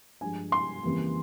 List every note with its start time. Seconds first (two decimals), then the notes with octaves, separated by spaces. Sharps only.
0.21 G2 F3 G#3 G#5
0.52 C6
0.83 F2 C#3 E3 G3 A#3